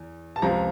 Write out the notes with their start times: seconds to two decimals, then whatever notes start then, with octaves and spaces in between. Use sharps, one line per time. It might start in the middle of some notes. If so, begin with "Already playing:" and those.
Already playing: E2
0.36 A5
0.42 C#2 C3 F3 A#5